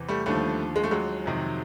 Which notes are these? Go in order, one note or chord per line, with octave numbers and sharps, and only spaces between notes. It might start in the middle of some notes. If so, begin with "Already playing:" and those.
Already playing: E2 C3 E3
G3 A3
D#2 D3 F3 G3 A3
G#3
A3
F#3 G#3
F2 C3 D#3